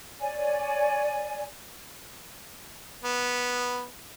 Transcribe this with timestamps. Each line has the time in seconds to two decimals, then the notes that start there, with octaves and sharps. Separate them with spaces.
0.21 C#5 D5 G#5
3.03 B3